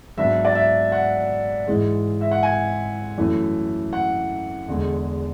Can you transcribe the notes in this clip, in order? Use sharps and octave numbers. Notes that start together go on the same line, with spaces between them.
G#2 F#3 B3 D4 E5
D5
E5
F#5
G#2 E3 G#3
E5
F#5
G#5
F#2 E3 A3
F#5
E2 D3 G#3